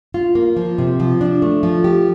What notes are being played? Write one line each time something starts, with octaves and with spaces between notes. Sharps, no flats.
F4
A#3
F3
C3
F3
D4
A3
F3
G4